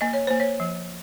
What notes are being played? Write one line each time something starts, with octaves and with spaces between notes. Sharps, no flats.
A#3 D#5
C#5
A#3 C5
C#5
F3